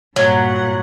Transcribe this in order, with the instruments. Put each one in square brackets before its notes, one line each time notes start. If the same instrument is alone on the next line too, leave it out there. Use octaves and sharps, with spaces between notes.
[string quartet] G2 A#2 F#5 [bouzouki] F#3